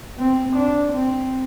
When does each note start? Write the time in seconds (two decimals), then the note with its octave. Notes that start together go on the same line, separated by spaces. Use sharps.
0.19 C4
0.57 D4
0.93 C4